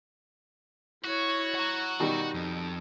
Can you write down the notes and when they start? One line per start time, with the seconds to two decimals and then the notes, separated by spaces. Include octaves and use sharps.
1.04 E4 F#4 C#5
1.55 F#5 A#5
2.00 B2 D#3 G3 D#4
2.34 F2